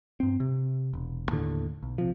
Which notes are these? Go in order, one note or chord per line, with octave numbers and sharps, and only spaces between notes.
G2 C4
C3
E1
D#2 A2 D3
B1
C3 F3